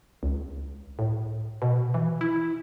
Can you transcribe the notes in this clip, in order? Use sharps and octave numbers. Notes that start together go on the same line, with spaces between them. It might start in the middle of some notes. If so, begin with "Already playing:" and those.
C#2
A2
B2
E3
E4